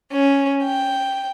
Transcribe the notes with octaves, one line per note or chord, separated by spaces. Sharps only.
C#4
G5